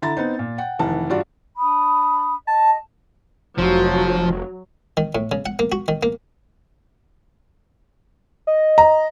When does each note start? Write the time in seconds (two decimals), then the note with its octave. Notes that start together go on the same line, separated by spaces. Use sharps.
0.02 D3 E4 A#5 A6
0.17 B3 C4 D#4
0.39 A#2
0.58 F#5 G5
0.79 F1 D#3 E3 F#5 A5
1.10 G2 F4 F#4 D5
1.57 D4 B5 D#6
2.47 D#5 A5
3.59 F1 F3 F#3
4.97 D#3
5.15 A2
5.32 C#3
5.46 F#5
5.59 A#3
5.72 F#4
5.88 D#3
6.03 A#3
8.47 D#5
8.78 A#5